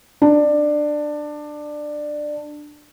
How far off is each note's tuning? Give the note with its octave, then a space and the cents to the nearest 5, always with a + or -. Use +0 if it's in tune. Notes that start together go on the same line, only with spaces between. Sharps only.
D4 +15